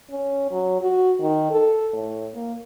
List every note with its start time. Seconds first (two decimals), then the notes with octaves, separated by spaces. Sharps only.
0.11 C#4
0.51 F#3
0.81 F#4
1.21 D#3
1.51 A4
1.94 A2
2.34 A#3